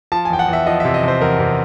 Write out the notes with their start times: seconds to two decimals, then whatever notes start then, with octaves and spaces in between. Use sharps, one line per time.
0.12 F3 A5
0.25 G#5
0.30 E2 G5
0.39 F#5
0.48 E2 E5
0.66 F3 D#5
0.80 C3 E5
0.94 D#5
1.03 C3 C5
1.21 E2 A#4
1.40 C3